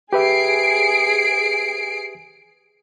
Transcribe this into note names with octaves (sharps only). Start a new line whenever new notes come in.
G4 G#4 B4 E5 C7 D7